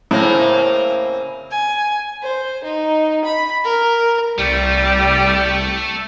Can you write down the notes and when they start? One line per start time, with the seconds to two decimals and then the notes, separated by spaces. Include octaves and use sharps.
0.11 A2 C#3 A#3 C4
1.51 G#5
2.22 C5
2.64 D#4
3.24 B5
3.64 A#4
4.38 C2 G3 A3